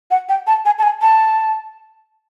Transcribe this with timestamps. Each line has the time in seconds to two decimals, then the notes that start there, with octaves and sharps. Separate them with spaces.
0.11 F#5
0.29 G5
0.47 A5
0.65 G#5
0.78 A5
0.83 G#5
1.02 A5